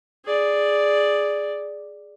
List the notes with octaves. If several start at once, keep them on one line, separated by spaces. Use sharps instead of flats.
G#4 D5